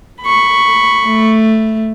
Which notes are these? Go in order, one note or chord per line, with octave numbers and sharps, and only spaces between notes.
B5 C#6
A3